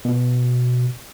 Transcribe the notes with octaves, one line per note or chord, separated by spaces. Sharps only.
B2